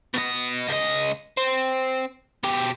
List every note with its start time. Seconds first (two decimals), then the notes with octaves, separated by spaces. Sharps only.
0.14 B2 D#5
0.68 C#2 D#5
1.37 C4
2.44 B2 G4